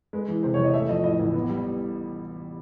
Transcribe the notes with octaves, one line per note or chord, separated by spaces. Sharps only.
G#3 B4
E3
C3 C5
E2 C#5
D#5
A3 E5
F3 D#5
A2 D#5
A1
B3
G3